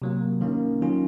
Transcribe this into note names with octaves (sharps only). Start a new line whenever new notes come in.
C3 F#3 A#3
D#3 A#3 C#4
D#3 F#3 C#4 F4